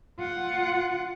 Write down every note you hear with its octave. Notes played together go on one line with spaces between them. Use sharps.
F4 F#5